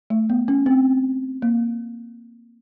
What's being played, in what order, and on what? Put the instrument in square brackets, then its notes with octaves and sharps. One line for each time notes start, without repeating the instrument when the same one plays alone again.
[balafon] A3
B3
C#4
C4
A#3